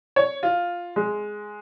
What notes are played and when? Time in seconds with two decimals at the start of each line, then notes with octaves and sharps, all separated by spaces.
0.16 C#5
0.43 F4
0.96 G#3